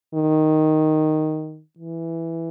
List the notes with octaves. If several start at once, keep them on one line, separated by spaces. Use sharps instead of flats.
D#3
E3